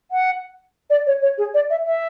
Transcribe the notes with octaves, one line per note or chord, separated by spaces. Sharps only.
F#5
D5
C#5
C#5
G#4
D5
E5
E5